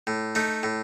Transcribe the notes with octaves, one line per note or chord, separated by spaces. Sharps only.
A2
A3 D#4
A2